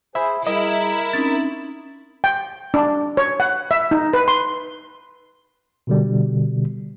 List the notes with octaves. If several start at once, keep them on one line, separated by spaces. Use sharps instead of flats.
G#4 C5 E5 B5
G3 E4 G#4 A#4 D#5
C4 C#4 D#4 A6
G5
D4
C#5
F#5
E5
D#4
B4
C6
B2 D3 G3